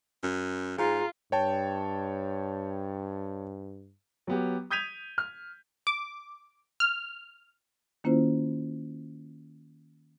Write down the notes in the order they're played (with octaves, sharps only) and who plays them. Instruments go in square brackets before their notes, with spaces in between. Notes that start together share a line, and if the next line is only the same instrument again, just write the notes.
[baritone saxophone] F#2
[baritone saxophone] G#2 [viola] F4 [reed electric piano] G#4 A#5
[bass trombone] G2 [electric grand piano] C#5 G5 A5
[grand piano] F#3 B3 G4
D#6 G6 G#6 B6 D#7 F7
F6
[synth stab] D6
F6
[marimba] D#3 A#3 C#4 E4 F4 C5